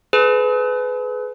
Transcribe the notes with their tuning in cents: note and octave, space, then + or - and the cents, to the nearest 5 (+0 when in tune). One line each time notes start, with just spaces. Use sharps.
G#4 +40 B4 +25